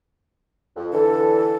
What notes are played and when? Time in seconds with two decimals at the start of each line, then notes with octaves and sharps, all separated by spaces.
0.76 F2
0.93 D3 E3 A4